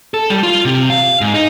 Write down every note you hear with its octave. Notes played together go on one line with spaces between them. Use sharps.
A4
G3
F4
C3
F5
G#2
D#4